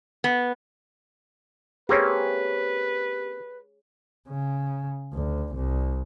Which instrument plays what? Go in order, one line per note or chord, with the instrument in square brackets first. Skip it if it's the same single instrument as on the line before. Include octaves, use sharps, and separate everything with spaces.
[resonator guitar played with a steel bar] B3
[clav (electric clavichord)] A#3 C4 C#4 [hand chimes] G4 [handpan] G#4 C#5 [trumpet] B4
[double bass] C#3
D2
C2